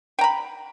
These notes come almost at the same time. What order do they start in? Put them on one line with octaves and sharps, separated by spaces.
G5 A#5 B5